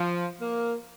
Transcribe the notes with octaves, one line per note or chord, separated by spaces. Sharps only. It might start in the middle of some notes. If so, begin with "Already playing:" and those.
Already playing: F3
A#3